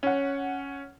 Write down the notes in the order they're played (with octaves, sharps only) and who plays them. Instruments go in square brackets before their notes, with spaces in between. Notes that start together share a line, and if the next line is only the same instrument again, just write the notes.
[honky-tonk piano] C#4 F#5